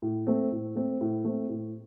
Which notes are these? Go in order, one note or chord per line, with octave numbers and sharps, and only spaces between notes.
A2
A3 C4
A2
A3 C4
A2
A3 C4
A2